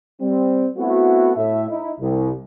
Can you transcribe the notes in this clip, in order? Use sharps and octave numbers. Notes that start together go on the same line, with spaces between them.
G3 C4
A3 B3 C4 E4 F#4
A2 E5
D#4 E4
C2